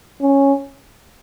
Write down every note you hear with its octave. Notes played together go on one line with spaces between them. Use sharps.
C#4